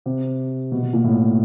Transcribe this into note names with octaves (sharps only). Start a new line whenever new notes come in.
C3
B2
B2
A#2
A2